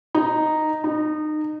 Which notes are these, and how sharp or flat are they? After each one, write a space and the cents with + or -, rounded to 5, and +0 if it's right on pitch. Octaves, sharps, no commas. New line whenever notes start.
D#4 -5
D#4 -25